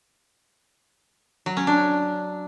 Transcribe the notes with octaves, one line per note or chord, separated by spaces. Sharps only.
F#3
C#4
D4